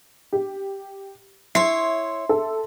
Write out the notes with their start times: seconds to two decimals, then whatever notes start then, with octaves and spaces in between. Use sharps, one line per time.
0.33 G4
1.55 E4 C#5 E5 C6 C7
2.29 A4